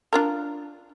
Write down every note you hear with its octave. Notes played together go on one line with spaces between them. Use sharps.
D4 F4 A#4